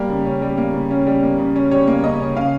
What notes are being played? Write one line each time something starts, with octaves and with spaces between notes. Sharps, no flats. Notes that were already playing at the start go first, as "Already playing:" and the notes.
Already playing: G3 A#3
C#3
C#4
G3
A#3
C#3
C#4
G3
A#3
C#3
C#4
G3 C#5
A#3
C#3 D#5
C#4
C#3 F5